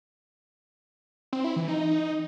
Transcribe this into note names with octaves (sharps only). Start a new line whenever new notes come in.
C4
E4
E3
D#4